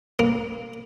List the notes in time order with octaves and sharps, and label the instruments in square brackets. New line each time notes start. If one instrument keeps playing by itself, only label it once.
[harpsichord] A#3